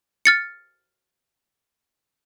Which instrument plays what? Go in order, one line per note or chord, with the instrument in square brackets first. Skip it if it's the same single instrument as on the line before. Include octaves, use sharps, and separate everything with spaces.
[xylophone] F6 A6 C#7